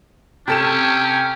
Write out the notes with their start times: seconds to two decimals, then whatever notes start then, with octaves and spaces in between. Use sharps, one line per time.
0.48 C3 C#4 A4 G5 E7